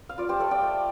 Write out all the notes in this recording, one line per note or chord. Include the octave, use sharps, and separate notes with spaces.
F5
F4 D5
G4 C5
A3 A4 D5
D5 G5
A3